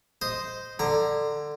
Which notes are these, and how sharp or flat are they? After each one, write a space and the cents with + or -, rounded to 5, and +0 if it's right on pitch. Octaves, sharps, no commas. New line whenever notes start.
C5 -10 D#5 +0
D3 +15 A#5 +0